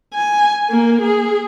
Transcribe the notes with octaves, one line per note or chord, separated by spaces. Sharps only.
G#5
A#3
G#4